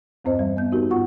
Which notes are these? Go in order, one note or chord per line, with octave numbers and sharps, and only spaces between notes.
E2 G2 C4 C5 D#5
E3 G3
B3 G6
B3 D#4 F#4 G4 A#4
G#2 B3 F4 F#5 C#6